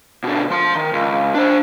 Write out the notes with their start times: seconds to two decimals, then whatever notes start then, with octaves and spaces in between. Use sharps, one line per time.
0.24 B2 D3
0.50 F3 C6
0.75 D#3
0.93 C#2
1.35 D4 C5